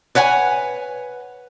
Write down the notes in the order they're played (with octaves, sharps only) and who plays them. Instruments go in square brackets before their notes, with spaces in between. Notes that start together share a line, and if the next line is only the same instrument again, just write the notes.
[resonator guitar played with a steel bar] B4 C#5 F#5 G#5